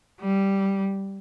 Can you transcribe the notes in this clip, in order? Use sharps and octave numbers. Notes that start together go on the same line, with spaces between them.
G3